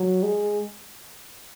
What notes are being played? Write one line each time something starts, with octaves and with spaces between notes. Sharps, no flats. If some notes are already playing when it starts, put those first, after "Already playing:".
Already playing: F#3
G#3